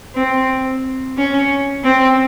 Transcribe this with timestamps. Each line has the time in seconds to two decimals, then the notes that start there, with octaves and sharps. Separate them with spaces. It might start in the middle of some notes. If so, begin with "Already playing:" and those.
0.15 C4
1.17 C#4
1.84 C4